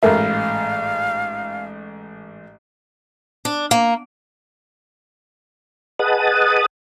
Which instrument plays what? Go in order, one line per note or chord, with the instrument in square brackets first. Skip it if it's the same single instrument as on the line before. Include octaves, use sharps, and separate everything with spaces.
[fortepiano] A1 G#2 A3 [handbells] A4 A#4 E5 [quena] F5
[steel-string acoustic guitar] D4
A#3
[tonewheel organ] G#4 B4 D#5 F#5 A5 D#6